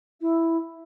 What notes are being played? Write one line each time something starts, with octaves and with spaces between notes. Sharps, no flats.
E4